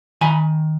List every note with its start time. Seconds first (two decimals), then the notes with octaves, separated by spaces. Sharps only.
0.21 D#3 G#5 B5